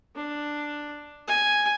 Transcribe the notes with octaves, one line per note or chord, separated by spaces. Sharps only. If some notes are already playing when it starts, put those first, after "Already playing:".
D4
G#5